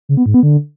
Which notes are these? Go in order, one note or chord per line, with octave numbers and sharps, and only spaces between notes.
C#3
B3
G#2
B3
D3